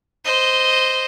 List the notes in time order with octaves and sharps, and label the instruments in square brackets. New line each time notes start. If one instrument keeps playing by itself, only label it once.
[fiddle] C5 D#5